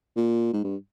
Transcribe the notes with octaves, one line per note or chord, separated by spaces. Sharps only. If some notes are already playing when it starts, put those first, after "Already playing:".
A#2
G#2
G2